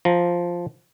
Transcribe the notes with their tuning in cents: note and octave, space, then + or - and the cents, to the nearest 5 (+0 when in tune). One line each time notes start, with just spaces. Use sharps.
F3 +0 A#5 +0